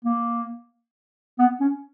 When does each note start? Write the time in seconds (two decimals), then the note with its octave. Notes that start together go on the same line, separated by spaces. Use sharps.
0.05 A#3
1.39 B3
1.60 C#4